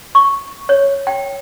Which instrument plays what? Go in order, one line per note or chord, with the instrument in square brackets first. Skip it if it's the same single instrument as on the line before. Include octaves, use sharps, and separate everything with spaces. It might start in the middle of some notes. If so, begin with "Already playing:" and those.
[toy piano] C#6
C#5
G5